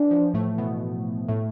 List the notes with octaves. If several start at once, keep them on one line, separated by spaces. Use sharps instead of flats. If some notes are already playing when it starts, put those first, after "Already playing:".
Already playing: E3 D4
F3
A2 A3
B2 B3
A2 A3